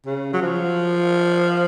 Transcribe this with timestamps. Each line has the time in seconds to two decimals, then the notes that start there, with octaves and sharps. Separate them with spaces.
0.06 C#3
0.33 F#3
0.41 F3